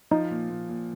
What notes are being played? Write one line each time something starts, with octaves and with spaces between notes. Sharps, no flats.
F3 D#4
A#2
A#2
A#2